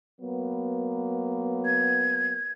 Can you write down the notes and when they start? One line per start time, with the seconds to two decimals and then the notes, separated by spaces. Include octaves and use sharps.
0.21 F#3 A#3 B3
1.65 G#6